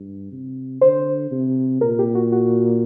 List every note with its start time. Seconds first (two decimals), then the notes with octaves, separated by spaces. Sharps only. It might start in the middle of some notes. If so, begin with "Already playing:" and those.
Already playing: G2
0.31 C3
0.81 D3 C5
1.31 C3
1.81 A#2 A#4
1.99 G4
2.15 F#4
2.32 F#4